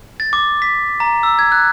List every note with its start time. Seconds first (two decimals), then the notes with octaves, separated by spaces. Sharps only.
0.20 A6
0.33 D6
0.62 B6
1.00 A#5
1.23 E6
1.39 G#6
1.52 F#6